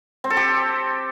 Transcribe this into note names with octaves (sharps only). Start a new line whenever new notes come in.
C4
A4
G4